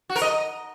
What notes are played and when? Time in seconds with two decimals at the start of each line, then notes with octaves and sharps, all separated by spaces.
0.09 F#4
0.16 A#4
0.22 D#5